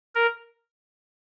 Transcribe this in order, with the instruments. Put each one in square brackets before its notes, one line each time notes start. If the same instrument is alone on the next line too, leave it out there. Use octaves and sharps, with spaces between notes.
[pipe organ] A#4